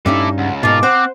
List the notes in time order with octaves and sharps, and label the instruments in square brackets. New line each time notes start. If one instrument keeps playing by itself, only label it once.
[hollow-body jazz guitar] G2 C#4 D#4 [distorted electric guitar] E4 A4 [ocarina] D6
[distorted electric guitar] C#2 [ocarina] F#5
[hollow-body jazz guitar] G#2 B2 [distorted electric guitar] F4 A#4 [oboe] A5 [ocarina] D6
[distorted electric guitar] C4 [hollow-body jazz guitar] C5 [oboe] F#5